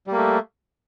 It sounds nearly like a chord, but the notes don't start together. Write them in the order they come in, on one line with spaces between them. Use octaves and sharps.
G3 A#3 A3